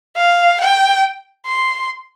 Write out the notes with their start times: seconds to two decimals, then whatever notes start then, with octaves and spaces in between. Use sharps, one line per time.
0.17 F5
0.61 G5
1.46 C6